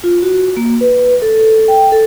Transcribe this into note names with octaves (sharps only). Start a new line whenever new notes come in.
F4
F#4
A#3
B4
A4
G5
A4